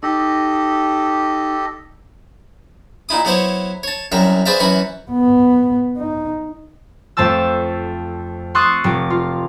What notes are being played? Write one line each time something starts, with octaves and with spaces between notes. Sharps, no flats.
D#4 G4 A4 D#5
A#2 D#4 E4 D#6
F#3 B3 E4 C5 C#5
C#5 A5
C2 F#2 F#3 A#4 E5
G#4 B4 C5 D5 E5 F5
F#2 E3 F#4 B4
B3
D#4
F2 A3 C5 A5 E6
C6 C#6 D#6 E6 F#6 A6
F1 D6
F4